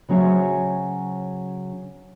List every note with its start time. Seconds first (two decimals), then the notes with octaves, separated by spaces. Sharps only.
0.09 C#3 F#3 C#4 C5 C#5 E5